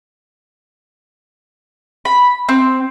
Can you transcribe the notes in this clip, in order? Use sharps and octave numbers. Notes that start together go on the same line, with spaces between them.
B5
C4